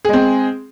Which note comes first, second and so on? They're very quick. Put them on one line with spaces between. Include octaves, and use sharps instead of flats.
G#4 G#3 C4